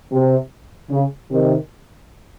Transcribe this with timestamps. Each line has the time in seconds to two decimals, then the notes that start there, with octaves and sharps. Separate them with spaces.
0.12 C3
0.91 C#3
1.31 C3 D#3